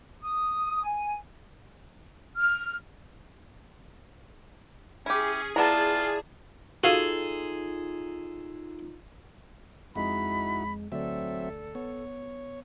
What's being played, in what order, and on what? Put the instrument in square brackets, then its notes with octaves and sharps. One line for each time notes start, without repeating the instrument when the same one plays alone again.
[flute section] D#6
G#5
F6
[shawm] C#4 [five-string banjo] E4 G4 [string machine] G#4
[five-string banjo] B3 A#5 [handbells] E4 D5 A5 [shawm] F4
[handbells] D#4 F4 [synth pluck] F#4 F5 D#7 [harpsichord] G#4 A4
[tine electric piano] F2 G#3 G#4 [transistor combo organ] D#4 E4 F#4 [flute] B5
[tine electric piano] D2 D5 [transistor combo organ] F#3 C4 E5 [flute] A4
[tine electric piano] B3 [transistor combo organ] C#5